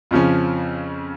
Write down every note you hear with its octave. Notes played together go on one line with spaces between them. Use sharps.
F2 C#3 F3 C#4